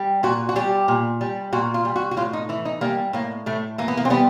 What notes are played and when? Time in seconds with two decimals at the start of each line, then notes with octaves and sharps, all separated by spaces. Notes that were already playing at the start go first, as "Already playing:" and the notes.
Already playing: G3
0.23 A#2 F#4
0.49 F#4
0.56 G3 G4
0.88 A#2
1.21 G3
1.53 A#2 F#4
1.74 F4
1.85 G3
1.96 F#4
2.11 F#4
2.17 A2 F4
2.33 D#4
2.49 E3 E4
2.65 D#4
2.81 G3 A#3
3.13 A2 A#3
3.46 A2 A3
3.78 E3 A#3
3.88 B3
3.97 A#3
4.05 C4
4.10 G3 B3